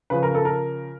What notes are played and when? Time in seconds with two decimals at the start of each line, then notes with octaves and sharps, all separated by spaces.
0.10 C#3 F3 B4
0.23 A#4
0.35 A4
0.45 A#4